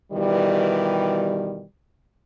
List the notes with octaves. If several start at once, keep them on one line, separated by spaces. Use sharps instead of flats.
B2 D#3 E3 G3